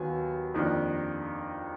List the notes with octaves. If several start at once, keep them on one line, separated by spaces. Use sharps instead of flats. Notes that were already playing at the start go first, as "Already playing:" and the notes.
Already playing: D#2 D#3 F#3 B3 G#5
F2 D#3 A#3 D4